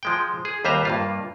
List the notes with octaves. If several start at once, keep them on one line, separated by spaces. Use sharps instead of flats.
F3 G#3 G5
G#4
D#2 G3 B4 C5 E5 A#5
G2 A#3 F4